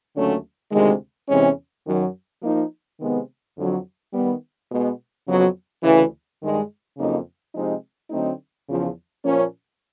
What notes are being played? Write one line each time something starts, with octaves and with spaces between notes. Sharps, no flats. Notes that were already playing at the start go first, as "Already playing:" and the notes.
D#2 D3 F#3 A3 C#4
D2 C3 D#3 G#3
E2 C3 E3 G#3 C#4
F#2 D#3 F#3
F3 A#3 D#4
C3 D#3 G#3 B3
F2 D3 F#3
D#3 G3 B3
B2 G#3 B3
F2 C#3 F#3 B3
D2 C#3 E3
G2 D#3 G#3
F2 C#3 F#3 A#3 D#4
C3 F3 G#3 C4 D#4
D3 F#3 A3 C4 D#4
E2 C#3 F3
A#2 F3 A#3 C#4